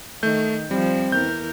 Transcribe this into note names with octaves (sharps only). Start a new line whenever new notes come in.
D#3 A3 G6
F3 G3 C4
E2 A#4 G6